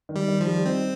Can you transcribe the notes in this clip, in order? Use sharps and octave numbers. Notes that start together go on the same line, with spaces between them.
D#3
G3
D#3
F3
G3
C4 D#4